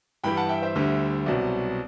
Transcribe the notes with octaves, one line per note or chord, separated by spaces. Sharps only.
G2 E3 G3 G5 B5
F#5 A5
E5 G5
C5 E5
D2 D3 G3
C2 B2 F#3 C4 D5